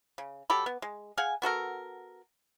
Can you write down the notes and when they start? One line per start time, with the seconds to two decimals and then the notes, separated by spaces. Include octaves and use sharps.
0.18 C#3
0.50 F#3 G4 A4 B5
0.66 B3
0.82 G#3
1.18 G#4 F5 F#5 G#5
1.42 B3 F#4 A4 A#4